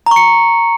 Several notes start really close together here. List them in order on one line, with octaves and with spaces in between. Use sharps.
A#5 C#6 C#7